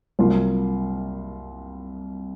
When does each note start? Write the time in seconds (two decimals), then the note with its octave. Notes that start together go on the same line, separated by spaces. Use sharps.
0.19 C2 C3 F#3 A#3 F4